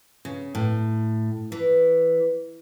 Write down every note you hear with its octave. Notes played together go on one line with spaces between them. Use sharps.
C#3
A2
E3